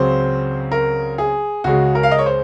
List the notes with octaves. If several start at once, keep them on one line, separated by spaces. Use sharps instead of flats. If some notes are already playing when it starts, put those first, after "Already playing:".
Already playing: C#2 C#3 F#3 C4 C5
A#4
G#4
C#2 C#3 G#3 F#4
A#4
F5
D#5
C#5
C5